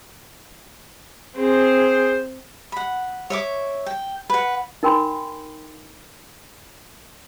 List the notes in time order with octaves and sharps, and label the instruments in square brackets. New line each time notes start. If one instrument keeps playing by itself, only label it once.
[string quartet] C4 [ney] G#4 [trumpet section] C5
[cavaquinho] F#5 B5
C#5 E5 D6
G5
B4 F#5
[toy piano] D#4 A#4 G5 G#5 B5 C6